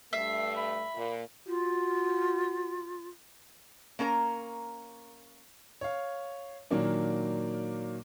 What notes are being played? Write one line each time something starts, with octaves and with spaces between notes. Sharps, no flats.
G2 A3 E5 C7
B5
A#2
F4 F#4
A#3 C#4 A#4 A#5
C#5 F5
A#2 D#3 F#3 A#3 D4